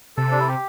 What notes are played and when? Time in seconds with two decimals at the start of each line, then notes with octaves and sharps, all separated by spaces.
0.17 C3 A4
0.32 D4
0.40 E4
0.48 G4